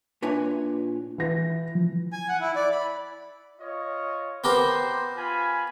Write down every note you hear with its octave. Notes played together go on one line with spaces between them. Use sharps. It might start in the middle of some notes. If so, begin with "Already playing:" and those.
A#2 D4 E4 B4 C#5 G#5
E3 A#6
F3
G#5
F#5
E4
D5
B5
F4 C#5 D#5
B3 G4 A#4 C5
F4 G#5 B5